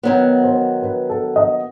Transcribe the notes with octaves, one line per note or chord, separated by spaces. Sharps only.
D#3 F#3 B3 B4
C5
B4
A4
D#5